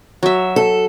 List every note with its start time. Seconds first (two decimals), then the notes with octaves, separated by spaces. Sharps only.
0.23 F#3 E5
0.56 A4